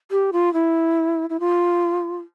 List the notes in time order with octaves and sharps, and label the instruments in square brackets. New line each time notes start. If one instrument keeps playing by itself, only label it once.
[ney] G4
F4
E4
E4
F4